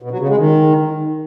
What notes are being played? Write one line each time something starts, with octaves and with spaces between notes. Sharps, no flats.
B2
F#3
C#3
G#3
D#3